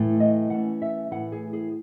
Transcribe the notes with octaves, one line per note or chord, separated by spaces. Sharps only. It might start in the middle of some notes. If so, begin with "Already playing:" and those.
Already playing: A2 E3 A3
D#5
E3 A3 C#4 F#5
E5
A2 E3 A3 F#5
G#4
G#4